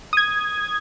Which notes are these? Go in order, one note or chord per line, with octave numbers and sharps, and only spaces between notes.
D#6 G#6